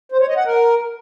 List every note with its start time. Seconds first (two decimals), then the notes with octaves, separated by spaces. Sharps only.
0.12 C5
0.20 C#5
0.29 D#5
0.37 F#5
0.45 A#4